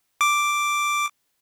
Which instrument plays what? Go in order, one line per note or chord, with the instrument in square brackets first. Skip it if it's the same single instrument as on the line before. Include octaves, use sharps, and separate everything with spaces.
[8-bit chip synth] D6